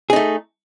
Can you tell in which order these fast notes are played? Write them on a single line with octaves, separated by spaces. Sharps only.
G#4 D#4 A3